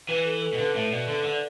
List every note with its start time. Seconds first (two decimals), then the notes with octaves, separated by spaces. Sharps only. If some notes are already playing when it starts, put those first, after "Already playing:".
0.08 E3 B4
0.25 A4
0.42 A4
0.53 B2
0.58 D3 B4
0.75 A2 E5
0.91 B2 D5
1.08 D3 A4
1.24 D3
1.33 D5